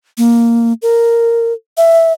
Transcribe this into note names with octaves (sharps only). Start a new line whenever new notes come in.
A#3
A#4
E5